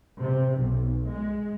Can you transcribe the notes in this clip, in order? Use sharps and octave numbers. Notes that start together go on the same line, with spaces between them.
C3
B1
G#3